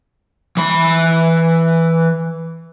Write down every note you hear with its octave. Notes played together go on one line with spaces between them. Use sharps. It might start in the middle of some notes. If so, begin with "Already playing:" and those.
E3 B5